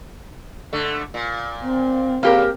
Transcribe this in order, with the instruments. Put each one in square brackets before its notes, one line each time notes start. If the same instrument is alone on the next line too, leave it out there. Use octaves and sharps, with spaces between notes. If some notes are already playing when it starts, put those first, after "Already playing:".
[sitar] D3 A3
A#2
[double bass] C4
[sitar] C#3 [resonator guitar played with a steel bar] A#3 G4 A#4